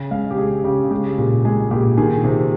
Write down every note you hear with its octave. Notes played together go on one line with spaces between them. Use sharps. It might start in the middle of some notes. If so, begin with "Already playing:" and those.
Already playing: C#3
G#3 F5
G4
G#3 G#4
C#3 G4
G#3 G4
A#2
G#3 G#4
A#2 G4
D#3 G#4
C3